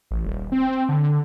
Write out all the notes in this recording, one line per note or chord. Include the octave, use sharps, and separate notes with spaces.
A1
D#1
C4
D3